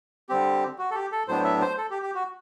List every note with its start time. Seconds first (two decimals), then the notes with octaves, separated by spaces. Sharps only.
0.29 D3 G3 C4 G4
0.78 F#4
0.91 A4
0.95 G4
1.12 A4
1.28 A2 F#3 B3 D4 C5
1.44 E5
1.61 C5
1.78 A4
1.90 G4
2.02 G4
2.15 F#4